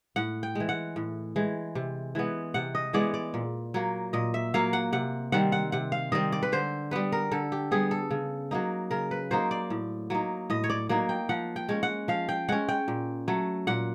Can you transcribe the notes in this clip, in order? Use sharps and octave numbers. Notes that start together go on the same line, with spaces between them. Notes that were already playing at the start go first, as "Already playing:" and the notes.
A2 F#5
G5
E3 G#3
F#5
A2
E3 G#3
C3
E3 G#3 B3
C3 F#5
D#5
E3 G#3 B3 D5
D5
A#2
F#3 A#3
A#2 D#5
E5
F#3 A#3 F5
F#5
C3 F#5
D#3 G3 C4 F#5
F#5
C3 F#5
F5
D#3 G3 C4 D#5
D5
B4
D3 C5
G3 B3 B4
A#4
D3 A4
G4
G3 B3 G#4
A4
C#3
F#3 A#3 D#4
C#3 A#4
B4
F#3 A#3 D#4 C5
D5
A2
F#3 A#3 D#4
A2 D#5
C#5
D5
F#3 A#3 D#4 D5
G5
F3 F#5
G5
G#3 C#4
F#5
F3 F5
G5
G#3 C#4 F#5
G5
A#2
F#3 A3
A#2 F#5